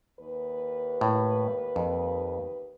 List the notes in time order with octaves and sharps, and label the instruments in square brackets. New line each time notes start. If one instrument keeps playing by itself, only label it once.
[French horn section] D#2 B4
[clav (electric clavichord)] A2
F2